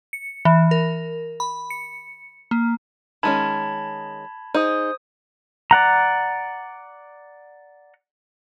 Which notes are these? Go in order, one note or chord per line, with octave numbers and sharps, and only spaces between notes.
C#7
E3
A#4
B5
C#7
A#3
D#3 G#3 C#4 A5 B5 G#6
D#4 G#4 C5 D#6
D5 F#5 A#5